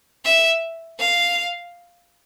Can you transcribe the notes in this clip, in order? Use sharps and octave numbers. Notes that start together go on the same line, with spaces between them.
E5
F5